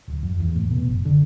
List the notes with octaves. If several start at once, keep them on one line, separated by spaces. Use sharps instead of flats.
D1
F2
E2
A2
B2
F#1
D3